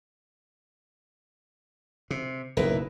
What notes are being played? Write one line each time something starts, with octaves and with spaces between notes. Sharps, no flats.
C3
F#1 B1 E4 A#4 B4